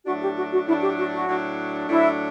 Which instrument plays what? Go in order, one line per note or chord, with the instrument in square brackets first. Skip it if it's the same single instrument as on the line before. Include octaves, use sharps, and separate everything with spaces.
[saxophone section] A2 F#3 A3 D4 [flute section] F#4
[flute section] G4
F#4
F#4
[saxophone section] A2 F#3 A3 D4 [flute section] E4
[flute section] G4
F#4
F#4
[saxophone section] A2 F#3 A3 D4
[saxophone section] A2 F#3 A3 D4 [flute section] E4